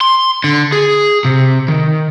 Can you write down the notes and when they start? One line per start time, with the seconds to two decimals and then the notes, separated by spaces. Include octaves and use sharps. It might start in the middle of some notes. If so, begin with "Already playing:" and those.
0.01 C6
0.44 D3
0.72 G#4
1.25 C3
1.68 D#3